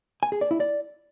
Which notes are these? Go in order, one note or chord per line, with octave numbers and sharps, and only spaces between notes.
G#5
G#4
D5
E4
D5